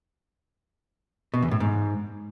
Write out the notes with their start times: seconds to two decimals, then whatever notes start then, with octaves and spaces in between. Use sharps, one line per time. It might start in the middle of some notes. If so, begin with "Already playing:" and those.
1.34 B2
1.42 E2
1.51 A2
1.60 G#2